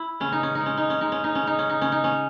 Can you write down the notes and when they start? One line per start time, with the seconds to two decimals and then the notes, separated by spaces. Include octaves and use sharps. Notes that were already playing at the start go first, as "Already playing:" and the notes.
Already playing: E4
0.20 C#3 C#4
0.32 D#4
0.43 C#4
0.55 D#4
0.61 G#3
0.66 C#4
0.77 D#4
0.90 C#4
1.01 G#3 D#4
1.12 C#4
1.24 D#4
1.35 C#4
1.42 C#3
1.47 D#4
1.59 C#4
1.69 D#4
1.82 C#3 C#4
1.92 D#4
2.04 C#4